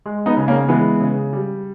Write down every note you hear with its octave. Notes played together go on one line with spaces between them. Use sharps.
G#3
B3 D#4
C#3
A#3 C#4
E3 G#3 B3
C#3
G3